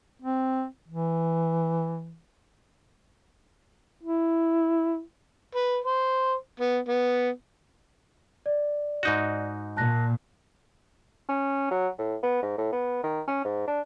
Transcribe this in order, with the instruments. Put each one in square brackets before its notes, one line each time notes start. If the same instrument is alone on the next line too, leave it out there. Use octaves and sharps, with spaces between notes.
[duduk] C4
E3
E4
[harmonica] B4
C5
B3
B3
[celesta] D5
[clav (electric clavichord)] G#2 D#4 F#4
[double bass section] A#2 [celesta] A5 F#6 A#6
[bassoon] C#4
F#3
A2
B3
G#2
A2
B3
D#3
C#4
G#2
D4